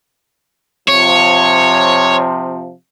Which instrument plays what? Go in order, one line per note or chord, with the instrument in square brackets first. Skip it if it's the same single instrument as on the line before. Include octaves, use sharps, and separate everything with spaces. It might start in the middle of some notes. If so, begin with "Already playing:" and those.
[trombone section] C3 F3 [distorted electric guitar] C#5